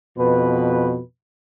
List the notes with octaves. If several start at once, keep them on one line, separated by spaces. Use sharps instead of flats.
F2 B2 B4